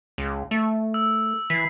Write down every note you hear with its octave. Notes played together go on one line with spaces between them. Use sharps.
C#2
A3
E6
E3 B6 C7